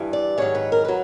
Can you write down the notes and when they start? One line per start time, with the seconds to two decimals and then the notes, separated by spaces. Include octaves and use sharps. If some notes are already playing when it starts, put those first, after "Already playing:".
Already playing: G2 E3
0.13 D5
0.38 G#2 D#3 F#3 C#5
0.55 B4
0.72 A#4
0.85 F#3 B4